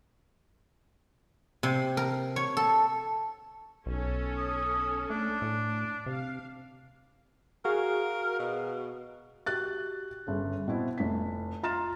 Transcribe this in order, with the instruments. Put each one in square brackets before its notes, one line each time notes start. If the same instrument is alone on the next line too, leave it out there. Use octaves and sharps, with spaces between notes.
[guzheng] C3
A#4
C#5
A4
[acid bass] B1 [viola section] C#4 A4
[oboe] D#6
[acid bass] A3 [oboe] D4
[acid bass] A2
[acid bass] C3 [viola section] F5
[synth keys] F#4 G#4 F5 [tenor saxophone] A#4
[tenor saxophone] B2
[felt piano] F#4 G4 F#6 A6
G1 C#3
B2 C4 E4
F1 B6
F4 A#5 F6 A6 E7